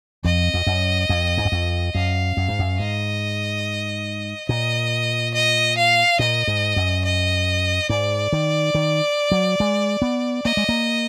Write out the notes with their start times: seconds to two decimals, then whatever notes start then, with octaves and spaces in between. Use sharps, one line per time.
0.24 F2 D#5
0.54 F2
0.67 F#2
1.09 F2
1.38 G#2
1.45 F#2
1.52 F2
1.95 F#2 F5
2.37 F#2
2.48 G#2
2.59 F#2
2.79 G#2 D#5
4.49 A#2 D#5
5.34 D#5
5.78 F5
6.19 A#2 D#5
6.48 G#2
6.76 F#2
7.05 D#5
7.90 G#2 D5
8.33 D#3
8.75 D#3
9.31 F#3
9.60 G#3
10.02 B3
10.45 A#3 D#5
10.57 G#3
10.69 A#3